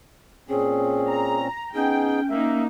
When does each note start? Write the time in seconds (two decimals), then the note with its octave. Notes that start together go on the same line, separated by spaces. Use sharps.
0.49 A#2 C4 C#4 G#4
1.09 A#5
1.75 B3 C#4 D#4 G#4 G5
2.30 A#3 D#4 E5